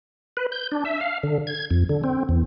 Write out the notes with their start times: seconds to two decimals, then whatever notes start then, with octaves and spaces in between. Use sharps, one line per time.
0.37 B4
0.52 G6
0.72 D4
0.85 E5
1.01 F5
1.23 D3
1.47 G#6
1.71 F2
1.89 D3
2.04 C4
2.29 E2